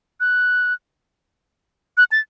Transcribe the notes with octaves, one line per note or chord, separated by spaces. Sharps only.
F#6
F#6
A6